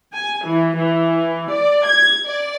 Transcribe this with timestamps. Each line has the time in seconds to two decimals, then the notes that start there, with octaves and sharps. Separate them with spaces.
0.14 G#5
0.46 E3
0.76 E3
1.51 D5
1.87 G#6
2.26 D5